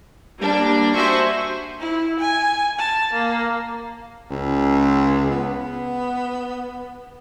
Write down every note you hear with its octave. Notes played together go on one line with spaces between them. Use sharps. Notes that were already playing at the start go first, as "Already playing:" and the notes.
G3 A#3 D4
F#4 C5 E5 G#5 C#6
E4
G#5
A5
A#3
C#2
B3